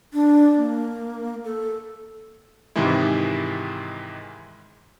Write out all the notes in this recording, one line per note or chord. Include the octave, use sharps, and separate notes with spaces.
D4
A#3
A4
G#2 C3 D#3 E3 G#3 E4